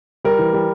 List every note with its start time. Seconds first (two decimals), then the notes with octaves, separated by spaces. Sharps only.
0.24 G3 A#4
0.39 E3
0.53 G3